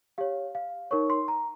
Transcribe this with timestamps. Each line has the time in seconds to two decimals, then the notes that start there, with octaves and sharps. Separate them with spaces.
0.18 G4 C#5 F5
0.55 F5
0.91 D#4 A#4 C#5 C#6
1.10 C6
1.28 A#5